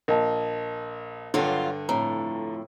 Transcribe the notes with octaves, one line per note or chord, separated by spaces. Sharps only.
A#1 A#4 D#5 A5
G2 D3 F#3 F4
F2 A2 A#5